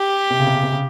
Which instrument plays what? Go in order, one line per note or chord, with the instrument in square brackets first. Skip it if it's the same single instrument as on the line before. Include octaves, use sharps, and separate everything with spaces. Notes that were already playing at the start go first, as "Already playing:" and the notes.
Already playing: [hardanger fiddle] G4
[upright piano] C3
C#3
C3
C#3
C3
C#3